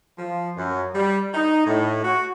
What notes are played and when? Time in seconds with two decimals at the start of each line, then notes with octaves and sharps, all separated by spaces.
0.18 F3
0.57 F#2
0.94 G3
1.34 D#4
1.66 A2
2.03 F#4